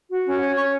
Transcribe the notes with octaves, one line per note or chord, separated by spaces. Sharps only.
F#4
C#4
C#5
C#4 C#6